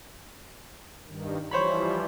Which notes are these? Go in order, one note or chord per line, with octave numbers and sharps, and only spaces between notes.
G2 D#3
E3 F3 G3 C5 C#5 B5